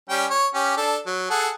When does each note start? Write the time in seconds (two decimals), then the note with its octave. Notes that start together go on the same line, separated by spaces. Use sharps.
0.10 G3 C#4 G5
0.30 C#5
0.54 C#4 G4
0.77 D4 A4
1.06 F#3
1.30 G#4 A4 F#5